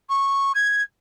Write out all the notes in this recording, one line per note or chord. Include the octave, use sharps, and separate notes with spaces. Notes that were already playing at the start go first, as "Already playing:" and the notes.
C#6
G#6